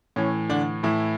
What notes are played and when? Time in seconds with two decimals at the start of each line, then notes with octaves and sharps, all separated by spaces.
0.16 A2 E3 C#4
0.49 D3 D4
0.83 A2 E3 E4